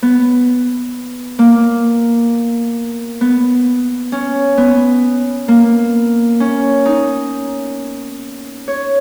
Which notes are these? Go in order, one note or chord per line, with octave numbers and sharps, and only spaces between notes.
B3
A#3
B3
C#4
B3
A#3
C#4
D#4
C#5